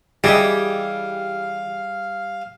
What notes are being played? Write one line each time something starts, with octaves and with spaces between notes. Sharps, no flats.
E3 G3 G4 G#4 D#5 F5